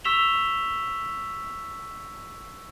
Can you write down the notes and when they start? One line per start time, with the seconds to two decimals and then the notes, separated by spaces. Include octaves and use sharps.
0.04 C#6 E6 B6 E7 F7 G7